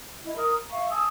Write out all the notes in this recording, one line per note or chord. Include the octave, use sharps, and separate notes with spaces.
E4 D#5
A#4 A#5 D#6 F6
A#5
E5 F5 C#6
G#5 A5 D#6 E6